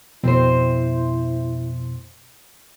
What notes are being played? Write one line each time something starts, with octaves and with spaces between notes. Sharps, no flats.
F2 B2 C4 E4 C5